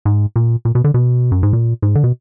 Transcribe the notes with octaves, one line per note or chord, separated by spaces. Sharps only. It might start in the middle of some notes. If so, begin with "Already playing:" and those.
G#2
A#2
A#2
B2
D3
B2
F#2
G#2
A#2
G#2
D3
B2